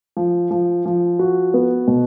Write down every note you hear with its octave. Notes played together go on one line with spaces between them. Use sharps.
F3
F3
F3
F#4
B3
B2